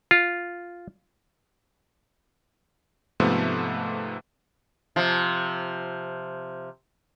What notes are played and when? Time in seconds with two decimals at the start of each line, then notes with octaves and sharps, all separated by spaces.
0.11 F4
3.20 G#2 C3 F3 A3 B3
4.96 C3 F3